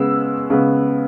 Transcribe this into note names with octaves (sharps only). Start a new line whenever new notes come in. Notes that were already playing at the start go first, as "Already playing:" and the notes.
Already playing: C#3 G#3 B3 E6
C#3 G#3 B3